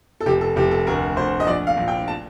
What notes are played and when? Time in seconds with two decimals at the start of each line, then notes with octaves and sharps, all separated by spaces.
0.20 A4
0.26 F1 G4
0.41 A4
0.56 F1 G4
0.71 A4
0.87 D2 A#4
1.17 D2 C5
1.40 D#5
1.47 A#1 D5
1.67 F5
1.77 A#1
1.88 G5
2.08 A5